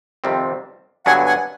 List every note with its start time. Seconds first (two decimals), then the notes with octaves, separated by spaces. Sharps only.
0.24 F2 C3 D#3 G3 C4
1.06 G2 D3 F#3 B3 D4 F#5 G#5
1.26 F#5 G#5